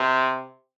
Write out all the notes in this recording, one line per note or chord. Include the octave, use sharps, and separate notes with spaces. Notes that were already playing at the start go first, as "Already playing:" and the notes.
Already playing: C3